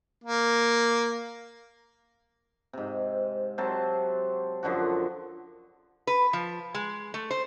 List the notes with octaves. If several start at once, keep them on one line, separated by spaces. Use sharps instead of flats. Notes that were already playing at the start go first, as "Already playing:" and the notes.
A#3
G#2 C3
C3 F#3 C5 A5
F#2 D3 F3 F#4
B4
F3
G#3
A3
C5